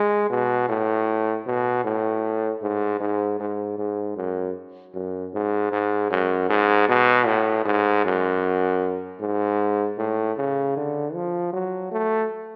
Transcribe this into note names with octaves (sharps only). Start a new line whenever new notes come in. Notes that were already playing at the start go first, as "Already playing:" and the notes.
Already playing: G#3
B2
A2
B2
A2
G#2
G#2
G#2
G#2
F#2
F#2
G#2
G#2
F#2
G#2
B2
A2
G#2
F#2
G#2
A2
C#3
D3
F3
F#3
A3